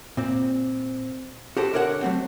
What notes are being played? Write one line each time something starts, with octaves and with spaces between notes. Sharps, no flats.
A#2 C4
F#4 G4 A4 C5
D3 A#4 C#5 D#5 F#5
F#3 A3 C4